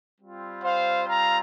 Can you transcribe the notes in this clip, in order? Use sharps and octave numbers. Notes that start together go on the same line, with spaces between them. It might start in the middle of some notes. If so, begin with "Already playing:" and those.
G3 C4 F4
C5 F5
F5 A#5